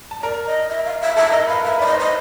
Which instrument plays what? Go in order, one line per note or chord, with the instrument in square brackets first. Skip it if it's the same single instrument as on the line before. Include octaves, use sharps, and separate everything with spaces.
[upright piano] A5
[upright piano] A#4 A#5 [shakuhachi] D5
[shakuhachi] D#5
E5
F5
E5
[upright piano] A4 A5 [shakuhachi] E5
[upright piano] A#4 A#5 [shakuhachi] D#5
[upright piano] B4 B5 [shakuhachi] F5
[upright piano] A#4 A#5 [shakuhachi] E5
[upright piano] B4 B5 [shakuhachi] D5
[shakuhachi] D#5
[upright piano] C5 C6
[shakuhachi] D#5